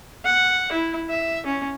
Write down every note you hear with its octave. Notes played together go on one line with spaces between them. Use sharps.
F#5
E4
E5
C#4